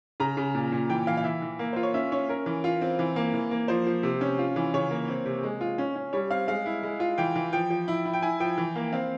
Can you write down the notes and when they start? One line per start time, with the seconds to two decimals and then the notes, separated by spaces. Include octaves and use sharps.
0.20 C#3 A#5
0.37 C#3
0.55 A#2
0.72 A#2
0.89 E3 G5
1.07 E3 F5
1.17 F5
1.24 E3 E5
1.42 E3
1.59 A#3
1.73 F4 C5
1.83 C#5
1.94 C#4 E5
2.12 C#4 C#5
2.29 C#4 A#4
2.46 E3
2.64 F4
2.81 C4
2.99 E3
3.16 A#3
3.34 E3
3.51 A#3
3.68 F3 C5
3.87 F3
4.03 C3
4.21 C#4
4.39 F4
4.56 E3
4.74 C#3 C#5
4.91 A#3
5.08 C4
5.25 C3
5.43 G#3
5.61 F4
5.78 C#4
5.95 C#4
6.13 G3 C#5
6.31 C4 F5
6.48 G#3 F5
6.66 E4
6.83 G#3
7.00 F4
7.18 E3 G5
7.36 E3
7.53 F3 G5
7.70 F3
7.88 E4
8.06 E4
8.13 G5
8.22 E4 G#5
8.40 F3 G5
8.58 E3
8.75 A#3
8.93 C4 F5